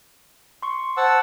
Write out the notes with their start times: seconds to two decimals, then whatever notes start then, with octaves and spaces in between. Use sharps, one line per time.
0.62 C6 C#6
0.97 C5 F#5 A5 E6